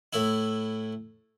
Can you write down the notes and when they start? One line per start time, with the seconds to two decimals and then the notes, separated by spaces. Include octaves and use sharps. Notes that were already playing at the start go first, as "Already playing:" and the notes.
0.13 A2 E4